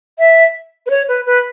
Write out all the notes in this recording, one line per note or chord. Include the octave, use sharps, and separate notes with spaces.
E5
B4
C#5
B4
B4